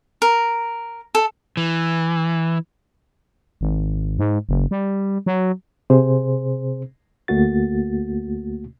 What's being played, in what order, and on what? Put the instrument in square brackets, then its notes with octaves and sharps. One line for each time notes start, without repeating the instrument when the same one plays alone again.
[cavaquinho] A#4
A4
[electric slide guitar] E3
[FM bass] G#1
G#2
F#1
G3
F#3
[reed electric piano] C3 C4 G#4 C5
D2 A3 A#3 F#4 A6